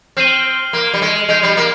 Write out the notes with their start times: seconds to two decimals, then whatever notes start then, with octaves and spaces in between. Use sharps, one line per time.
0.17 C4 F6 C7 D#7 G7
0.73 A#3
0.94 G3
1.02 G#3
1.29 G#3 G6 C7 F7
1.43 G3
1.57 A#3